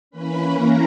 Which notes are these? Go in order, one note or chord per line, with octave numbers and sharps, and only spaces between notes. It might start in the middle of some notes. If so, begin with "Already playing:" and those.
E3 A#3 C#4 B4 B5
A#4 A#5